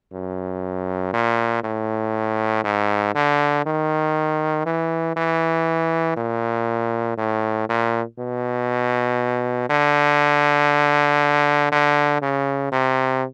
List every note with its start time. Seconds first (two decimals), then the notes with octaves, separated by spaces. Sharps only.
0.13 F#2
1.13 A#2
1.64 A2
2.64 G#2
3.15 D3
3.66 D#3
4.66 E3
5.16 E3
6.17 A#2
7.17 A2
7.69 A#2
8.18 B2
9.69 D3
11.72 D3
12.22 C#3
12.72 C3